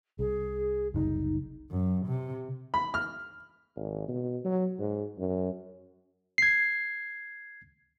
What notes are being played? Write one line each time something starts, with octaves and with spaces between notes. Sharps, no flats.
C2 G#4
F#1 C2 D#4
F#2
C3
B5
F6
G#1
B2
F#3
G#2
F#2
G#6 C7